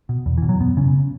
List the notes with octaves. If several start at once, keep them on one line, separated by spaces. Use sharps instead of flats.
B2
E2
E3
B2
F#3
F#2 B3
C#3 C#4